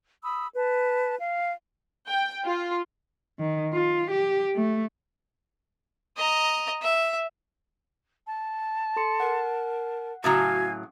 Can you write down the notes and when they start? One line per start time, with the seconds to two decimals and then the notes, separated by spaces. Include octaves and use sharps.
0.23 B5 D#6 E6
0.54 B4 A5
1.17 F5
2.08 G5
2.45 F4
3.39 D#3
3.73 F4
4.11 G4
4.55 A3
6.17 D#5 A#5
6.82 E5
8.25 A5
8.96 A4 C6 C#7
9.20 A#4 F#5
10.24 A2 C#3 F#3 F#4 F5 G#5 G#6